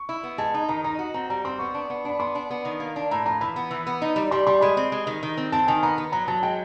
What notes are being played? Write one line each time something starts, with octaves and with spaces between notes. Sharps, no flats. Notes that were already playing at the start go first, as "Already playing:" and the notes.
Already playing: C#6
E4
B3
G#3 A5
D#4
D#3 A#5
D#4 A#5
F#4
C4 A#5
G3 A#5
C4 C6
B3 C#6
D4
B3
D4 B5
B3 C6
D4
B3
D#3
A#3
D4
A2 A#5
F3 A#5
E3 B5
B3
E3
B3
D#4
G3
G3 C6
G3 C6
G#3 B5
C4
G#3
D#3
D#3
C4
C4 A5
D#3 G#5
B3 A#5
B3
F#3 A#5
F#3 A5
G#3 G5